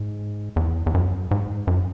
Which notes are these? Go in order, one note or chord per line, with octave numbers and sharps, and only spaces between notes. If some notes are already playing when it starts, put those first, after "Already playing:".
Already playing: G#2
E2
E2
F#2
G#2
F#2